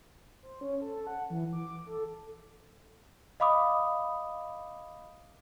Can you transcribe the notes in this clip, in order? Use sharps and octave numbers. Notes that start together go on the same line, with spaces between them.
C5
C#4
A4
F#5
E3
D6
A4
D#5 F5 B5 D6 D#6